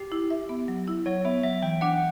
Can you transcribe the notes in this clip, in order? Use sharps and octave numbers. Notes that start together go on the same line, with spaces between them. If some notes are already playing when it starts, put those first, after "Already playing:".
Already playing: G4
E4
E5
B3
F#3
E4
F#3 C#5
B3 E5
F#3 E5
E3 G5
D4 F#5